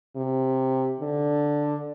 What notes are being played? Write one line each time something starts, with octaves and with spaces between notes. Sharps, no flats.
C3
D3